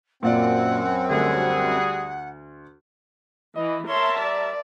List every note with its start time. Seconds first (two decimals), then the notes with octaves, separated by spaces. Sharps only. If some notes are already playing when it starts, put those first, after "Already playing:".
0.23 F#2 A#2 C4 F4 D5 F#5
1.10 D2 G3 F#4 G#4 F#5
3.56 E3 D#5
3.89 A#4 C#5 E5 A5 C6
4.18 G3 D5